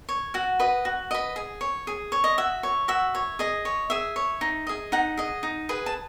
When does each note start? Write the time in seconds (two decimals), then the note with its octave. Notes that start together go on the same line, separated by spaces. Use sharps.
0.09 C#5
0.34 F#4 F#5
0.60 B4 D#5
0.85 F#4
1.11 B4 D#5
1.36 G#4
1.61 C#5
1.87 G#4
2.12 C#5
2.24 D#5
2.38 F#4 E5
2.63 C#5
2.88 F#4 E5
3.15 C#5
3.39 G#4 D#5
3.65 C#5
3.90 G#4 E5
4.16 C#5
4.41 D#4
4.67 G#4 D#5
4.92 D#4 F#5
5.17 G#4 D#5
5.43 D#4
5.69 G#4 B4
5.86 A5